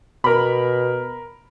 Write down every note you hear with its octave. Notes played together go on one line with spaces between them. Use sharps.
B2 A#4 B5